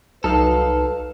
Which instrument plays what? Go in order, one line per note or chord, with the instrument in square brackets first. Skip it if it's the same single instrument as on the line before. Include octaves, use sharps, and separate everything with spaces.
[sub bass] C2 [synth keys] F#3 D#4 F5 [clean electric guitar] A4 [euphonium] B4